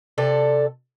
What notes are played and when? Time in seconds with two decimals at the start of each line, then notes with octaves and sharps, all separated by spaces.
0.18 C3 A4 D5